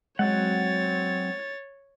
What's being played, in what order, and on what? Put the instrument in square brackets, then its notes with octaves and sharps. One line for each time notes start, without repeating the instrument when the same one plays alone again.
[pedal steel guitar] F#3 C4 F#5 [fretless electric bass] G#3 [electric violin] C#5 A6